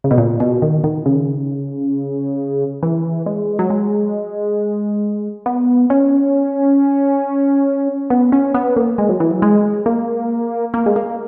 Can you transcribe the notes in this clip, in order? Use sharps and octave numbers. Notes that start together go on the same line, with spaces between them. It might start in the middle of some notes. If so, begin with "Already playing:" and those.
C#3
B2
A#2
B2
D#3
D#3
C#3
E3
G#3
F#3
G#3
B3
C#4
B3
C#4
B3
A#3
G#3
F#3
E3
F#3
G#3
A#3
A#3
G#3
A#3